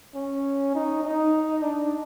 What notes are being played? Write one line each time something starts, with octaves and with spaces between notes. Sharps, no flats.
C#4
D#4
D#4
D4